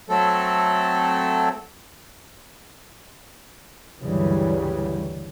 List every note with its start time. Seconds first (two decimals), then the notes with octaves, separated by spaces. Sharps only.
0.09 F#3 A3 C4 A4
4.01 D2 G2 C#3 E3 F#3 G3